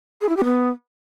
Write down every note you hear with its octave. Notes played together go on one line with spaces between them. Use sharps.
G#4
E4
G4
B3